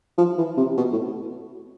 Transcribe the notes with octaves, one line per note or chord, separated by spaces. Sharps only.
F3
E3
C3
B2
A2